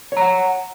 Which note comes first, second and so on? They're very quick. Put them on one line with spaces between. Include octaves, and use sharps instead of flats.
C#5 A#5 F#5